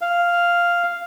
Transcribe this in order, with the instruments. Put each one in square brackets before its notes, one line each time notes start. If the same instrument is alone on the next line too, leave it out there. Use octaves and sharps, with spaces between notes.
[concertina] F5